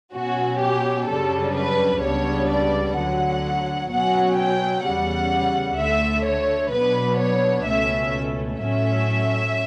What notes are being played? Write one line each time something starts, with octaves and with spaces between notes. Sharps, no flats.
B2 F#3 C#4 F#4
G4
F#2 C#3 G3 D4 A4
B4
C#2 C#3 G3 B3 D4 C#5
D5
D2 D3 F#3 F#5
B2 F#3 C#4 F#5
G5
E2 C#3 G3 F#5
D2 D3 A3 E5
C#5
B2 F#3 B3 D4 B4
C#5
C#2 B2 A3 C#4 E5
A2 F#3 A3 C#4 E5